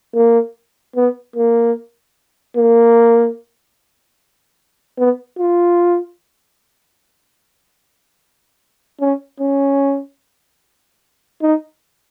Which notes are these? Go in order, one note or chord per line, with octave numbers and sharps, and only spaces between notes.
A#3
B3
A#3
A#3
B3
F4
C#4
C#4
D#4